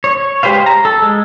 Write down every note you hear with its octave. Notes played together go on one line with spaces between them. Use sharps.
C#5
G#3 G4 B4 C5 F5
A#5
A4
G#3